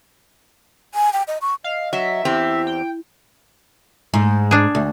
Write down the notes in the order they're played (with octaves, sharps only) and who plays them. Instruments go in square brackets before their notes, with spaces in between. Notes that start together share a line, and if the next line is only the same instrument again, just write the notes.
[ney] G#5
G5
D#5
C#6
[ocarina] D#5 [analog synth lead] F5
[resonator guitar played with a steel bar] F#3 [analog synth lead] E5
[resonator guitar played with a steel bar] E2 C4 G4 [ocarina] E4
[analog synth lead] G5
[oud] G#2
[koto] D4 G#4
[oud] D2